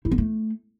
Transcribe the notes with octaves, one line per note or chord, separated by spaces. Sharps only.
E4
B3
A3